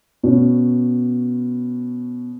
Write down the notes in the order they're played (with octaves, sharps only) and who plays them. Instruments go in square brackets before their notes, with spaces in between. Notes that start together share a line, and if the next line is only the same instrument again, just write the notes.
[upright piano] B2 C#4